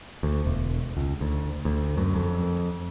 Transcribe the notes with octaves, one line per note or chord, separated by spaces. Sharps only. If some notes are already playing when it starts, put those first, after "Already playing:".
D2
E1
C#2
D2
D2
F#2
F2